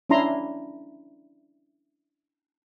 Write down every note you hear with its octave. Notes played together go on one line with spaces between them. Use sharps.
C#4 D4 E4 A#5 C6